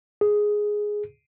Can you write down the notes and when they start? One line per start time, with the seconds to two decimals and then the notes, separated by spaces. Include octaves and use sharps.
0.21 G#4